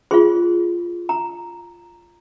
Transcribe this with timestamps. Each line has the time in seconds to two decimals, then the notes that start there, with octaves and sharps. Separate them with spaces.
0.11 F4 G#4 C5 C6
1.09 A#5